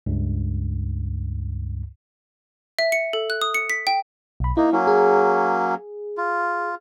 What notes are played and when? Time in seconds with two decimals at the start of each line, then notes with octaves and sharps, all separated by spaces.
0.06 C#2 G2
2.79 E5
2.92 C#7
3.13 A4
3.30 F#6
3.41 D#6
3.54 C#7
3.70 B6
3.87 G5
4.40 B1 B5
4.57 A#3 D#4 E4
4.72 F#3 A#3 C#4
4.87 G#4
6.18 F4